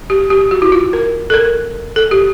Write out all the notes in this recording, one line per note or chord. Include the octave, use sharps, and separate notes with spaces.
G4
G4
F#4
E4
F4
A#4
A4
A#4
A4
G4